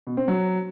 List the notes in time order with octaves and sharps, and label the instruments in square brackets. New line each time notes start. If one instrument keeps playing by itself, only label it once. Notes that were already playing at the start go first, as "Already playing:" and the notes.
[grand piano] B2
C4
F#3